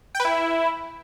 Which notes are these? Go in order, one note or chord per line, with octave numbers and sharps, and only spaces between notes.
G5
B4
E4